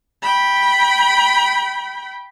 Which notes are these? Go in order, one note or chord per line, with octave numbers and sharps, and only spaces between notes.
G5 B5